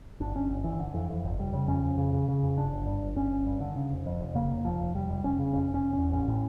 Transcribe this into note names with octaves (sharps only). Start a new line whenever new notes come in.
G1 D4
G1 C#4
G1
G1 E3
D3
F2 E3
F2 E3
G1
F1 G3
C#3
F2 C#4
F2
C#3
C#3
C#3
F2
G1 D4
G1
G2
G1
G1 C#4
G1
G2
D3
C#3
F1
F2
F1
C#3 A#3
F1
F1 F3
F1
F1 G3
F1
F1 C#4
C#3
F1 C#4
F1
C#4
F1
E2 C#4
A1 C#4
A2